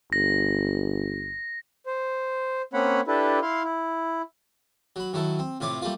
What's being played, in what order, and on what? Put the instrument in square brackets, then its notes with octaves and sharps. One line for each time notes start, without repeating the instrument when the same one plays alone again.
[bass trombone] G1 [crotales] A#6
[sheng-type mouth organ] C5
A#3 C4 C#4 C#5 F#5 B5
D4 E4 G4 A4 B4
E4 F5 C6
E4
[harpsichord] F#3 B5
D#3 F#3 E4 A4
C4
A2 C3 F4 C#5 D6
G3 A3 A#3 F4